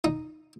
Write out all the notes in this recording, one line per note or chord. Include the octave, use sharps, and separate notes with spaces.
D#4